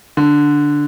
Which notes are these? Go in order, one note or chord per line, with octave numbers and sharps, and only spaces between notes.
D3